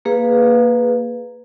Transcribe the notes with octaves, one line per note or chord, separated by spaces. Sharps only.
A#3 G#4 B4 F5